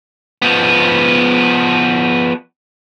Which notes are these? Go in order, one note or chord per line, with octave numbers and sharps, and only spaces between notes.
F3 B3